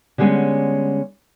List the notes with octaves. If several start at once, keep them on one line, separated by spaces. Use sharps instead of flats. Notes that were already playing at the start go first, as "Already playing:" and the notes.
D3 G3 G#3 A#3 B3 C#4